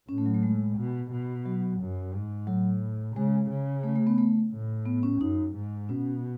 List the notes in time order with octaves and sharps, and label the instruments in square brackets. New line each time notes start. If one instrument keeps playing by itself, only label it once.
[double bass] A2 [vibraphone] C#4
[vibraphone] A3
F#3
A3
G#3
[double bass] B2
B2
[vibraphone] F#3
[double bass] F#2
G#2
[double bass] A2 [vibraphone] F#3
[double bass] C#3 [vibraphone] G#3
[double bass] C#3
[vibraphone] A3
A3
B3
A3
[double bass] A2
[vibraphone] B3
C#4
[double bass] F#2 [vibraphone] D#4
[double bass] G#2
[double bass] B2 [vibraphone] C#4